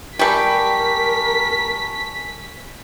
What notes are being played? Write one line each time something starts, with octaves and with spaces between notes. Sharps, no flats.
G3 G4 A#4 G#5 A5 C#6 B6